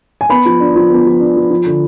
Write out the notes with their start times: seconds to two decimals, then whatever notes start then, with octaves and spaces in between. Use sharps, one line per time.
0.21 G#5
0.29 B3 B5
0.46 F3
0.60 D4
0.76 F3
0.91 B3
1.05 F3
1.20 D4
1.36 F3
1.50 F3
1.66 D3